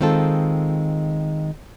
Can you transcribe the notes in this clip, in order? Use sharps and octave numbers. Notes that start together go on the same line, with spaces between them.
D#3 G#3 C4 F4 A4